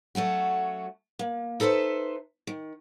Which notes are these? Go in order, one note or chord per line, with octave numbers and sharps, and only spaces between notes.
F#3 A3 C#4 F#4
A#3
D#4 A4 B4 C5 E5
D#3